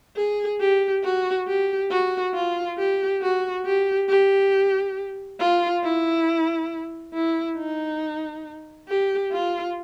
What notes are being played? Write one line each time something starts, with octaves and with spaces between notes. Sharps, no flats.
G#4
G4
F#4
G4
F#4
F4
G4
F#4
G4
G4
F4
E4
E4
D#4
G4
F4